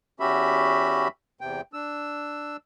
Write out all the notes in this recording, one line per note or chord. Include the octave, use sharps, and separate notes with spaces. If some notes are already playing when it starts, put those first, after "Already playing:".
E2 C#4 F#4 G4 E5 B5
E2 C3 G5
D4 E6